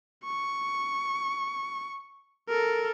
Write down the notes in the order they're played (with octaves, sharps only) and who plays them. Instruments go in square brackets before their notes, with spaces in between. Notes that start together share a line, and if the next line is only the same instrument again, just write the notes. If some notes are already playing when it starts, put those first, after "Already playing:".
[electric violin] C#6
A4 A#4